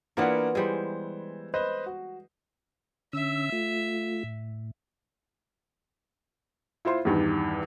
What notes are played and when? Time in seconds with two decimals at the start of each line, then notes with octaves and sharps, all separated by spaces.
0.17 E3 A#3 B3 D4 F4 F#5
0.55 E3 G3 G#3 C5
1.54 B4 C5 D#5
1.86 F#4
3.13 D3 C#4 E5 E6
3.52 A3 F4
4.23 A2
6.85 E4 F4 C5 C6
7.05 E2 G2 D#3